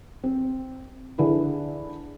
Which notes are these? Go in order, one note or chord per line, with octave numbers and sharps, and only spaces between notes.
C4
D3 E4 G#4 A4 B4